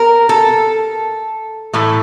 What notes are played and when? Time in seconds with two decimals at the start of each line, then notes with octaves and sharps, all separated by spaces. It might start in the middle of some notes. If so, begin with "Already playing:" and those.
Already playing: A#4
0.29 A4
1.73 A2 E3 A3